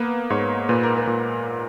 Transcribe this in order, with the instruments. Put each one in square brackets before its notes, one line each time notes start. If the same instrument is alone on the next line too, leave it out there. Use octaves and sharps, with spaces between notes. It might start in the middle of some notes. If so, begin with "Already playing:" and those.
Already playing: [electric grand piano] A#3 B3 [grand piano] A#4 B4
[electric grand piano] G#2 [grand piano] C#5
[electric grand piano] A#2 [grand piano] B4
[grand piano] A#4
B4
[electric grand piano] A#2